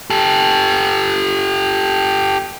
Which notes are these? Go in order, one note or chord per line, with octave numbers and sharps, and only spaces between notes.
G4 A4